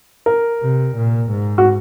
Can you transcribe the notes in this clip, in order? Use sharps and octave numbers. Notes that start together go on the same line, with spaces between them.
A#4
C3
A#2
G#2
F#4